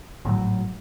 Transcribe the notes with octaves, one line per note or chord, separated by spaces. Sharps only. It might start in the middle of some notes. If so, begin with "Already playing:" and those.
G#1 A2 C#3 F#3